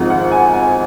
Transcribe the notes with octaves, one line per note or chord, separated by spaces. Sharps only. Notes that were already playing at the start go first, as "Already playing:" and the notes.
Already playing: G#1 G#2 F3 G#3
F#5
G#5
G#5